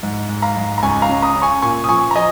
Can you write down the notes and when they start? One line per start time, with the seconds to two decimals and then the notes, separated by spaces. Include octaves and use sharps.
0.03 G#2
0.29 G#2
0.42 F5 A#5
0.57 G#2
0.78 A#5
0.83 C#2 G#5 C#6
1.02 F5 A#5
1.09 C#4
1.22 A#5 D#6
1.35 C#3
1.42 G#5 C#6
1.62 A#2 G#5 C#6
1.84 D#6
1.88 F3 G#5 C#6
2.11 A#5
2.16 F3 D#5 G#5